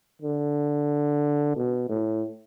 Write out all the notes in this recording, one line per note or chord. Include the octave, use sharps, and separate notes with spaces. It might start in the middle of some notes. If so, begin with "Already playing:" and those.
D3
B2
A2